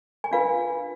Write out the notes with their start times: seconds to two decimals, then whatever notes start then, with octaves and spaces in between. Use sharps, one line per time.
0.24 G#5
0.31 D4 F4 B4 F5